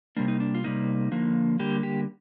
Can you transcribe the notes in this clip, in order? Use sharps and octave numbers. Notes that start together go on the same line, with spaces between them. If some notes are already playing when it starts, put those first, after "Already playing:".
C3 G3 A#3 D4
D#4
D4
F4
C3 G3 A#3 D#4
D3 F3 A#3
D3 G3 A#3 G4
G4